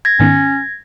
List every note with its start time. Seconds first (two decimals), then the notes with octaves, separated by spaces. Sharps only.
0.05 G#6 A#6
0.20 G#2 D#3 B3 C#4